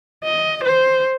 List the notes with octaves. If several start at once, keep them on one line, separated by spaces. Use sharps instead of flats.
D#5
C5